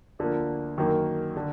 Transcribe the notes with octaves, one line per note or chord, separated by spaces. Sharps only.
D2 D3 F3 A#3
F#2 D#3 F#3 A#3
D3